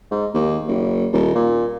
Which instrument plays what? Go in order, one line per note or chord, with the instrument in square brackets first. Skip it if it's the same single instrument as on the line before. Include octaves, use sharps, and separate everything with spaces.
[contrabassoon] G#2
D#2
F#1
D#1
A#2